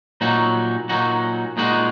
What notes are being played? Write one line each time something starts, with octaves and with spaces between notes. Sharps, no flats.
A#2 F#3 D#4 F#4
A#2 F#3 D#4 F#4
A#2 G#3 D#4 F#4